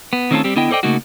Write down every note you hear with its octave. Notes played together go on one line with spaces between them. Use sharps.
B3
D#3 A3 C4 C#4 F4 A4
G3 C4 G4
D3 B3 E4 D#5 G5
A4 C5 D5 D#5 G5
C#3 A3 A#3 D#4 F#4